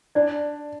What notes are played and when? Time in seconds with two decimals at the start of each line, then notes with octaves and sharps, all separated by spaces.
0.15 D4 D5